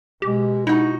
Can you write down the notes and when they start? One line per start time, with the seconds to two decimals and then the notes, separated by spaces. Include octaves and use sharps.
0.22 B2 G#3 G4
0.67 D#4 E4 F#4